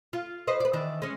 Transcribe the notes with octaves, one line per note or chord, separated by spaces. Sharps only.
F4
B4 C5 D#5
B4 D5
D#3 E3 D4
G#3 C#4